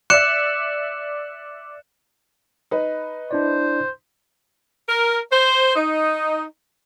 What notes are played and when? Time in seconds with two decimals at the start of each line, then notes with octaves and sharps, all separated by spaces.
0.10 D5 E5 F#6 C#7 E7
2.71 D#4 B4
3.31 D4 E4 C5 D5
4.89 A#4
5.32 C5
5.76 D#4